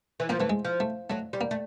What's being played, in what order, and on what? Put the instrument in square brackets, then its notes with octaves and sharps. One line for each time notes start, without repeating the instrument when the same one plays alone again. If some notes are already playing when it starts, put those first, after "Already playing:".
[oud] E3
[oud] F3 [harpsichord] A#3
[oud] E3 [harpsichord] A3
[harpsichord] G#3
[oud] F3
[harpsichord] A3
[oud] F#3 [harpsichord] A3
[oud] G3
[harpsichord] A#3
[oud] A3